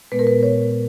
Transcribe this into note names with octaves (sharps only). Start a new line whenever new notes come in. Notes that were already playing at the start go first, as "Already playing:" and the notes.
A#2 G#3 B3 B4
A#4
B4
C#5